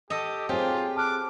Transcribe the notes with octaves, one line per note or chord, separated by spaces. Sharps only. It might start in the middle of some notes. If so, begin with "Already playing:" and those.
G4 A4 D#5
C4 F4 G4 G#4 C#5 G#5
A5 D6 F6 F#6